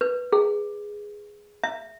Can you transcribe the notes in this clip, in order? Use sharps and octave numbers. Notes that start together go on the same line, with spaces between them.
B4
G#4
E5